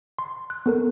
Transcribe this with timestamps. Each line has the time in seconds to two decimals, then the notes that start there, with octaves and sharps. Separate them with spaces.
0.19 C6
0.50 F#6
0.66 B3 A4 A#4